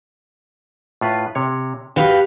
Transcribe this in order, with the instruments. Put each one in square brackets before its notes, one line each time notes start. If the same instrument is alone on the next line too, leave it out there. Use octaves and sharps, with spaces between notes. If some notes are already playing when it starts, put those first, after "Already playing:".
[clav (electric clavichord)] A2 F4 B4
C3 C#5
[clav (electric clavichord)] F#4 [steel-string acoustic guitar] G4 B4 F5